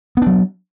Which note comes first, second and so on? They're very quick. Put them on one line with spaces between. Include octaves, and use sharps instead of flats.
B3 D4 F#3